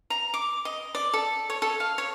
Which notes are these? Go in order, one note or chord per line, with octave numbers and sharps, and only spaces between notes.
A#5
D6
D#5
D5
A4
C#5
A4
F5
C#5